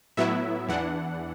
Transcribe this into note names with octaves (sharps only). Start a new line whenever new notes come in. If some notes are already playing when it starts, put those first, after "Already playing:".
A2 F#3 B3 E4 E5
E2 E3 D4 F#5